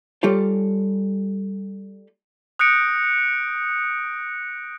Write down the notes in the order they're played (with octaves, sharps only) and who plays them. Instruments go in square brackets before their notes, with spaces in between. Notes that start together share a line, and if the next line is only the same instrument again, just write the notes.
[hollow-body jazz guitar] G3 F4 G4 A4 C#5
[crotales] D#6 F#6 G6 A#6 C#7 D7